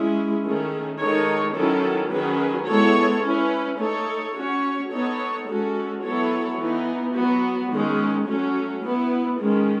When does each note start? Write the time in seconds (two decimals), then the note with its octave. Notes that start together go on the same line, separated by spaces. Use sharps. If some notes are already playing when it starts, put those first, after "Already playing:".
Already playing: G#3 C#4 E4
0.44 D#3 A3 C#4 G#4
0.99 D#3 G#3 D#4 A4 C#5
1.55 D#3 F#3 C#4 E4 A4
2.11 D#3 F#3 C#4 G#4 B4
2.67 G#3 B3 E4 A4 C#5
3.23 C#4 E4 B4
3.79 A3 D#4 A4 C#5
4.36 C#4 F#4 C#5
4.91 B3 D#4 A4 C#5
5.48 G#3 C#4 F#4 A4
6.04 F#3 B3 E4 A4 C#5
6.59 E3 B3 D#4
7.15 F#3 B3 F#4
7.72 D#3 G#3 C#4
8.27 F#3 A3 C#4
8.84 B3 E4 B4
9.40 D#3 G#3 C#4